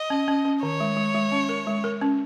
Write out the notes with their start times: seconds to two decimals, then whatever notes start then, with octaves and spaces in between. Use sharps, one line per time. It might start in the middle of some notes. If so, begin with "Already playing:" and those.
Already playing: D#5
0.10 C#4
0.28 C#4
0.45 C#4
0.63 D#3 C#5
0.80 G#3
0.97 G#3
1.15 G#3
1.32 C#4
1.49 A#4
1.67 G#3
1.84 A#4
2.01 C#4